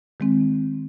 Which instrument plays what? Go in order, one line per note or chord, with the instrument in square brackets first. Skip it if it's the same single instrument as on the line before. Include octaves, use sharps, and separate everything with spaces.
[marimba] D#3 G#3 C4